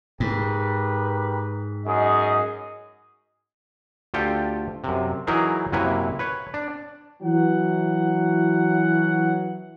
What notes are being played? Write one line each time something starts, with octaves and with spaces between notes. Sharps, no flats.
G#2 G4 A#4 B4
F#2 G#4 D#5
D2 F4 G4 A4 G5
F#2 C3
E3 F#3 D#4 E4 G#4 A#4
F#2 C3 A#3 E4 B4 C#5
B4 C#5
D4
E3 F#3 F#5